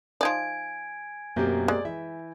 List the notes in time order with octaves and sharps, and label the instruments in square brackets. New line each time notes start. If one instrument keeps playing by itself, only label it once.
[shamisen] F3 D#4 D5 [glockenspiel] G#5 G#6 D7
[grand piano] F#2 B2 G6 [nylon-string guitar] A#3 C4 G4
[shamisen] G#3 [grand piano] D5
[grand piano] E3 [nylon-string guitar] E5